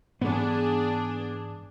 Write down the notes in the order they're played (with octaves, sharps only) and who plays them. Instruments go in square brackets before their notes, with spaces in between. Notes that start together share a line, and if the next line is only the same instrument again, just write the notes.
[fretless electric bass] G#2 E3 G3 [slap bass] B3 [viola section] D4 G#4